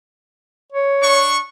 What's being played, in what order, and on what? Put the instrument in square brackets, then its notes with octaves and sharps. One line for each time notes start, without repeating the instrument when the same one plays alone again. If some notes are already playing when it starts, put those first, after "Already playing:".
[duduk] C#5
[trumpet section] D4 C#6